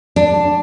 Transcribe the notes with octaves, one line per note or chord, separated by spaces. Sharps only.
D4